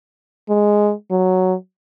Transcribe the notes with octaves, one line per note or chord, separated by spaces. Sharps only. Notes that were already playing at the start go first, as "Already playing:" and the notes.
G#3
F#3